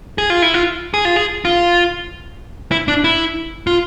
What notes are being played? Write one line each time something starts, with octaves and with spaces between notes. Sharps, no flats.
G#4
F4
E4
F4
G#4
F4
G#4
F4
E4
D4
E4
F4